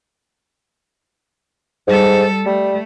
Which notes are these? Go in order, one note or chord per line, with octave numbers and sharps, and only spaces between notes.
G#2 G3 A4
G3 A3